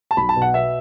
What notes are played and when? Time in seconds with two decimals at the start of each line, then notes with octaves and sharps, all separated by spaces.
0.11 A5
0.17 B1 B5
0.29 A5
0.36 B2
0.42 F#5
0.54 B3 E5